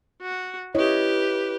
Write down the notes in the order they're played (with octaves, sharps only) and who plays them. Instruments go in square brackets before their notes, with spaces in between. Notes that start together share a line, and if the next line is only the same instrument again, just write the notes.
[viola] F#4
[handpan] E4 C#5 D#5 [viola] G4 B4